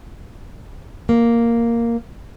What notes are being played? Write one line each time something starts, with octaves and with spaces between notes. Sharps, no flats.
A#3